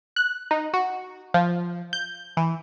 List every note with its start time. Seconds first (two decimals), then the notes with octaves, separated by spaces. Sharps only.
0.16 F#6
0.51 D#4
0.74 F#4
1.34 F3
1.93 G6
2.37 E3